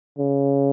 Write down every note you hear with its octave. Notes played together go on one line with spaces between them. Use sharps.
C#3